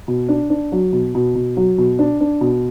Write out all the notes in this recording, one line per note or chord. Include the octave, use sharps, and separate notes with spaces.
B2
D4
D4
F#3
B2
B2
B2
F#3
B2
D4
D4
B2